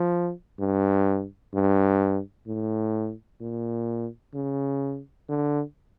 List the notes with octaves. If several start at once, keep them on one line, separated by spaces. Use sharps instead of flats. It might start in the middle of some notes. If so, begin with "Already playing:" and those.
Already playing: F3
G2
G2
A2
A#2
C#3
D3